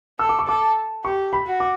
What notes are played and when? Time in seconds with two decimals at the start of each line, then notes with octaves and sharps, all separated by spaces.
0.19 A4 E6
0.29 D6
0.39 C#6
0.47 A4 D6
1.04 G4 C#6
1.33 B5
1.46 F#4
1.60 D6